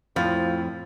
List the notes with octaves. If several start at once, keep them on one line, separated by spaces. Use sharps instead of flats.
F2 A2 F3 F4 B5